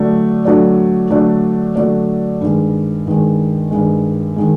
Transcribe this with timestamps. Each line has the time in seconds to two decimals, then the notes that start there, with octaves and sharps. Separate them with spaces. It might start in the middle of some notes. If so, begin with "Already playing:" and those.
Already playing: D3 F#3 A3 D4
0.45 D3 F#3 A3 D4
1.11 D3 F#3 A3 D4
1.76 D3 F#3 A3 D4
2.41 G2 D#3 G#3
3.06 G2 D#3 G#3
3.71 G2 D#3 G#3
4.36 D#3 G#3